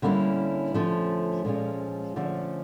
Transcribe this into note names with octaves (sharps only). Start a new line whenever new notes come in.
D3 G3 A#3 C#4 E4
D3 F3 A3 C#4
A#2 F3 G#3 C#4 F4
D3 F3 A3 C#4